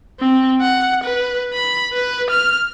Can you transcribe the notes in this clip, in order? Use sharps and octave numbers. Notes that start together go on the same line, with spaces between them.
C4
F#5
B4
B5
B4
F6